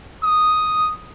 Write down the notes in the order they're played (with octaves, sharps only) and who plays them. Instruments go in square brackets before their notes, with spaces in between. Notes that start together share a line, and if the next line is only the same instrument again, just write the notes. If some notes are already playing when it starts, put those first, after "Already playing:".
[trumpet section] D#6